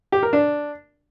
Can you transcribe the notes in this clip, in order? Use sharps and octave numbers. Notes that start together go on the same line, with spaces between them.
G4
A#4
D4